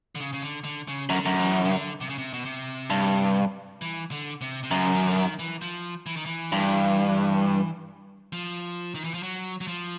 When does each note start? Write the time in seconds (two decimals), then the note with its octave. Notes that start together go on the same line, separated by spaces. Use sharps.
0.15 D3
0.20 C#3
0.33 C#3
0.42 D3
0.64 D3
0.88 C#3
1.09 F#2 D3
1.26 F#2
1.40 E3
1.65 C#3
1.71 D3
2.01 C3
2.09 C#3
2.18 C3
2.33 B2
2.45 C3
2.90 G2
3.82 E3
4.11 D3
4.41 C3
4.63 C3
4.71 F#2 C#3
4.94 D#3
5.06 D3
5.17 D#3
5.39 E3
5.62 F3
6.06 E3
6.16 D#3
6.26 E3
6.52 G2
8.33 F3
8.95 D#3
9.04 E3
9.14 F3
9.23 F#3
9.61 F#3
9.67 F3